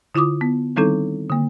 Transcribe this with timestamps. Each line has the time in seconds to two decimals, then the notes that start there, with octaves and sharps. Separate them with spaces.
0.15 D3 E4 F4 D6 D#6
0.41 B3
0.76 D#3 G3 C4 D#4 E4 A4
1.30 D3 A#3